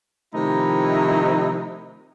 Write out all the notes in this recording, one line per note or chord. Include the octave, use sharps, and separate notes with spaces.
C3 D#3 F3 A3 D#4 E4